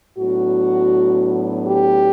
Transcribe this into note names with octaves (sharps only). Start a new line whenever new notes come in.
A2 F#3 B3 D4 F#4
G4